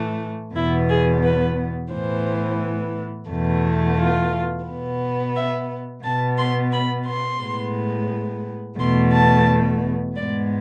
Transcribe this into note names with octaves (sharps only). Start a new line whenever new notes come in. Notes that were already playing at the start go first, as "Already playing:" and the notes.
Already playing: A2 E3 A3
E2 B2 B3 E4
G#4
B4
A2 E3 B3 C5
E2 B2 A3
F4
B3
B2
E5
B2 B3 A5
C6
B5
C6
A2 G#3 B3
E2 B2 A3 C6
A5
G#2 G#3 B3 D5